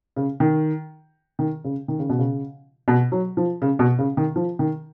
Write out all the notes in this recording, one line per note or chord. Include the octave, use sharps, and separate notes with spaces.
C#3
D#3
D#3
C#3
D#3
C#3
B2
C#3
B2
F#3
F3
C#3
B2
C#3
D#3
F3
D#3